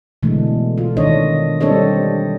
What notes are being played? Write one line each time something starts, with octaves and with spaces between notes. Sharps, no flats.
B2 D3 E3 G#3 A3
F4
D#3 D4 C#5 D#5
G3 C4 D4 A4 C#5 D#5